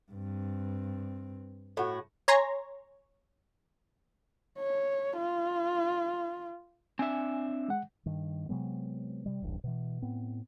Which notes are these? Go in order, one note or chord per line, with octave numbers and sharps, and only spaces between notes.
G2 C4
A2 F#4
C#5 G#5 A#5 C6 A#6
C#5
F4
C4 D4 E5 G#5
G#3 F#5
G2 D#3
C3 F#3 G#3 B3
C3 G3
D1 A1 G2
B2 E3
A2 B3 C4